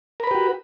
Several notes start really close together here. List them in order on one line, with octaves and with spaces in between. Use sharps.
A#4 B5 B4 G4 F#4